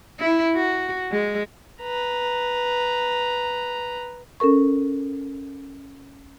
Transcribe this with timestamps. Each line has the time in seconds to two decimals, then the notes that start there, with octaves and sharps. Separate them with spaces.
0.19 E4
0.55 F#4
1.11 G#3
1.82 B4 A#5
4.40 C#4 A4 A#4 C#6